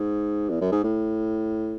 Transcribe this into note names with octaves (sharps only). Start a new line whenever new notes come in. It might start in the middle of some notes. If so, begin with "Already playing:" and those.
Already playing: G#2
E2
F#2
G#2
A2